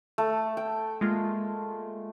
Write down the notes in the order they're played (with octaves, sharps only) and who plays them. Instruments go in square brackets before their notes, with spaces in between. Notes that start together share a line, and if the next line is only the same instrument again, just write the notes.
[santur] A3
G5
[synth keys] G#3 A#3 F4